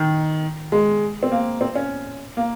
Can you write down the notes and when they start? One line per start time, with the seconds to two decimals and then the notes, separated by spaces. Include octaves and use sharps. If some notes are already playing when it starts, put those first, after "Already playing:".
Already playing: D#3
0.72 G#3
1.23 C4
1.32 A#3
1.61 C4
1.75 C#4
2.37 A#3